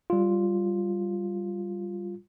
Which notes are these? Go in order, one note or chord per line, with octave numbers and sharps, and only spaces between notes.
G3 F4